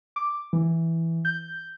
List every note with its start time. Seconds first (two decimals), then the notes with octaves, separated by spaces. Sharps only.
0.16 D6
0.53 E3
1.25 G6